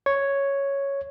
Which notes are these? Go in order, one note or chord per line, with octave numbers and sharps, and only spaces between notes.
C#5